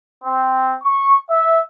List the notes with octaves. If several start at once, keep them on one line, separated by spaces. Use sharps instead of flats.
C4
C#6
E5